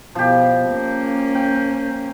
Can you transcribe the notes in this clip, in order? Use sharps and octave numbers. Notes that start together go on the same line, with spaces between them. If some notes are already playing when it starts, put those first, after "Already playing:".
B2 F3 G4
A#3 C#4
G5